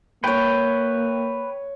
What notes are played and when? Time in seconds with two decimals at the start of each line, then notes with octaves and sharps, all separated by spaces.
0.24 A#3 B4 C#5 G5 C#6